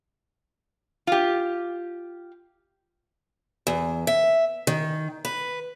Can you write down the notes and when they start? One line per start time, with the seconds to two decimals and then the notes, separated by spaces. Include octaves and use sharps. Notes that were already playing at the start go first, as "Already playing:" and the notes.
1.07 F4 G4
3.67 E2
4.07 E5
4.67 D#3
5.25 B4